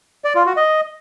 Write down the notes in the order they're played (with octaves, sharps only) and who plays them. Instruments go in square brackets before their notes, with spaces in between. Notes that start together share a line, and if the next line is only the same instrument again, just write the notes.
[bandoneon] D5
F4
F#4
D#5